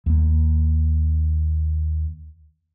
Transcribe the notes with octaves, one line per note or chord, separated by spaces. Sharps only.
D#2 A#3